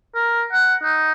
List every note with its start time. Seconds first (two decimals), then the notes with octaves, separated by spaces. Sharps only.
0.14 A#4
0.52 F#5
0.83 D#4